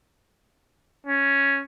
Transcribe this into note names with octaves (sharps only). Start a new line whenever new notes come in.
C#4